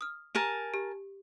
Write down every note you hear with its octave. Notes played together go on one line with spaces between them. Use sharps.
D#6 F6
G4 A#4 G#5 A5
G4